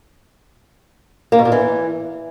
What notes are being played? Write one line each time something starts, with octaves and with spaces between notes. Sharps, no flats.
A#3
B2
A#2
E3